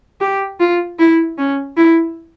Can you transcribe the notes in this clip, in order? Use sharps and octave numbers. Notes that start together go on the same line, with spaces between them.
G4
F4
E4
C#4
E4